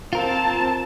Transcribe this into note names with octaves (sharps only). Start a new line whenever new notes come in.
C4 F4 A#4 A5